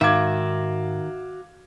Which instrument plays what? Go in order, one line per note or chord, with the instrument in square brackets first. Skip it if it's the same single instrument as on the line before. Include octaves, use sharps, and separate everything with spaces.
[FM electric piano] G#2 [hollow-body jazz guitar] D#3 [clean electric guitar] F#4 E5 [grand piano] F5 D6 G#6